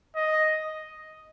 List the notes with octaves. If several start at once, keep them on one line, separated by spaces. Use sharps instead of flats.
D#5